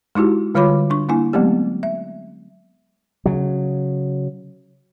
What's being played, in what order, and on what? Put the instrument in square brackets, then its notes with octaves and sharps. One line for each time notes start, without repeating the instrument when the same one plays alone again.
[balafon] G#3 D#4 E4 F#4 G4
D3 G3 F4 C#5 B5 D6
D4 C#6
A#3 D4 E4 G#5
F#3 G#3 A3 B3 C4 G4
E5
[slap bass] C#3 F#3